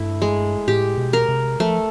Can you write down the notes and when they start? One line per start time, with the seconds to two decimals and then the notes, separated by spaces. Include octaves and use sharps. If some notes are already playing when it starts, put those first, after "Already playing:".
Already playing: G2 A3 E4
0.22 G#3
0.68 A2 G4
0.98 B2
1.13 A#4
1.29 C3
1.60 F3 A3